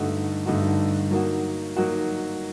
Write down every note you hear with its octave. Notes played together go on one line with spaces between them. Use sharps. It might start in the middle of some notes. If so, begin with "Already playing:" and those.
Already playing: G2 D3 A3 D#4 F#4
G2 D3 A3 D#4 F#4
F#3 A#3 D#4 F#4
F#3 A#3 D#4 F#4